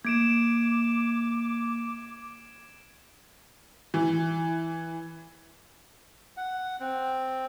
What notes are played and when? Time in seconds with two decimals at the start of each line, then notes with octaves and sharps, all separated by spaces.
0.05 A#3 D6 G#6 D7 E7
3.94 E3
6.37 F#5
6.80 C4